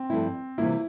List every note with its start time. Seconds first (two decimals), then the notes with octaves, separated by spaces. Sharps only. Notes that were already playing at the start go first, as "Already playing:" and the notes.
Already playing: C4
0.10 G2 F3 A3 E4
0.58 C3 E3 G3 A#3 E4 F4